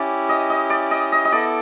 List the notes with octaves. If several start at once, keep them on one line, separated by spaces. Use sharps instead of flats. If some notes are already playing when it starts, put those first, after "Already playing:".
Already playing: C#4 E4 G4 D5
D#5
D#5
D5
D#5
D#5
D#5
B3 E4 A4 D5